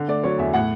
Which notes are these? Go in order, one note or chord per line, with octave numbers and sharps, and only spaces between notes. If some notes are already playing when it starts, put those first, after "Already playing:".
Already playing: D3
A3 D5
F#3 C#5
E2 E5
A2 F#5